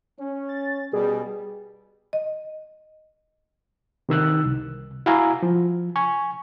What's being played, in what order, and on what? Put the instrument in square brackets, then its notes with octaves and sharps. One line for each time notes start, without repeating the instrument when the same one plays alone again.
[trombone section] C#4
[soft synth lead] A6
[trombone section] B2 G3 [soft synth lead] G#4
[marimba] D#5
[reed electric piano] C3 D#3 E6 F#6
C2
E4 F#4 E5 F5 G#5 A#5
F3
G#5 C#6